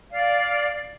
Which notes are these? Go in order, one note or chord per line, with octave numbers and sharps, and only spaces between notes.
D5 F5